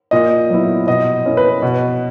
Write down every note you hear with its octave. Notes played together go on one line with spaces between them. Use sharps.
A#2 D#5
F#3 B3 E4
B2 D#5
A#3 C#4 E4
B4
B2